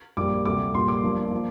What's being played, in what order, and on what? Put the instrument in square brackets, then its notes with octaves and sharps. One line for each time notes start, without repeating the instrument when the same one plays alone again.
[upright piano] A#1 A#2 G3 A#3 D6
D2 C3 G3 D6
A#1 A#2 G3 A#3 C6
D6
G1 G2 F3 A#3
F3 A#3